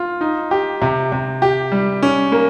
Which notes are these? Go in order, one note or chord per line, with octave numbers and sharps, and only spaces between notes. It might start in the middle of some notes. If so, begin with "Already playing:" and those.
Already playing: F4
D#4
G4
C3
C3
G4
G3
C#4
A#3